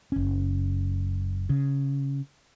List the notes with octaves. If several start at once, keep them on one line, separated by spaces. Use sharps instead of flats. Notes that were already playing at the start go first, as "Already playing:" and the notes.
F#1 C#4
C#3